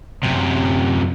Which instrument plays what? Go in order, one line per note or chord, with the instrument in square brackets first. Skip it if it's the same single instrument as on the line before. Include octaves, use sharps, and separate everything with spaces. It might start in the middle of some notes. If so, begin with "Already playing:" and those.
[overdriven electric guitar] F#2 C3